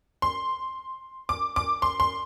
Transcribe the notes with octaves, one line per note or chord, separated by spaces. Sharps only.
C6
D6
D6
C6
C6